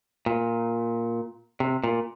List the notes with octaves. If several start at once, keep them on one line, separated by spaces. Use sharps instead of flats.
A#2
C3
A#2